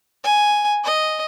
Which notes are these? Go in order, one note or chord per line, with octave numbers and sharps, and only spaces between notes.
G#5
D#5